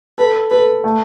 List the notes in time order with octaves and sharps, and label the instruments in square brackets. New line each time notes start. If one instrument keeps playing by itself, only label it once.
[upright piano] A4 [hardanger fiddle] B4
[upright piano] A4 [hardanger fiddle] B4
[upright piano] A3